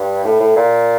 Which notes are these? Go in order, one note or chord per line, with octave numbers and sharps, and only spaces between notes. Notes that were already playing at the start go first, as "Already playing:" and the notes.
Already playing: G2
A2
A2
A#2